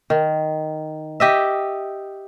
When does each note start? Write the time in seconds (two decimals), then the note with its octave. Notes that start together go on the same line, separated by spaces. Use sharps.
0.10 D#3
1.20 G4 D#5 E5